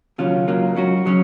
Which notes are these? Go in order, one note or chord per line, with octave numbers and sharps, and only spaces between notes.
D#2 C#3 F#3 C#4 F4
C#2 C#3 F#3 A#3 F4
G#2 F#3 C#4 F#4
C#3 F#3 C#4